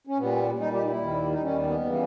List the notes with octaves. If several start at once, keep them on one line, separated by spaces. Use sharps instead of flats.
C#4
A#2 G3 B3
A#2 G3 D#4
G4
D#4
E4
D#2 D#3 G3
D#4
D#2 D#3 G3 C#4
B3
C#3 E3 G3